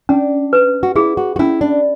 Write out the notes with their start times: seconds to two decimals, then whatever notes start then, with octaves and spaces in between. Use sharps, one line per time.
0.09 C#4 D4
0.53 B4
0.83 F#4
0.96 E4 G#4
1.17 F#4
1.36 F#4
1.39 C#4 E4
1.61 D4